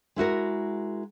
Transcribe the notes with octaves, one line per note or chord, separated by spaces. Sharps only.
G#3 E4 F#4 A#4